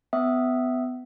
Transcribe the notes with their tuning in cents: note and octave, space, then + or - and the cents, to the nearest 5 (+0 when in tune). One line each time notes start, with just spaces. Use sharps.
B3 +30 E5 +0 D#6 +0